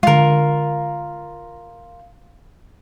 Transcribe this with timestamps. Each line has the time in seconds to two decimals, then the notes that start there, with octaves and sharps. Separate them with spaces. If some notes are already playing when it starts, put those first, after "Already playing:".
0.03 D3 G#3 F4 A#4